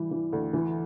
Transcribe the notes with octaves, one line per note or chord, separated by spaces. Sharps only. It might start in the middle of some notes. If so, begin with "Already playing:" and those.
Already playing: E3 G3
E3
D2
E3